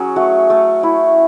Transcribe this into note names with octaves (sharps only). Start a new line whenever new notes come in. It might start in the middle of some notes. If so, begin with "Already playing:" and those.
Already playing: F#3 C#4 G#4
A3 F#4
A3
E4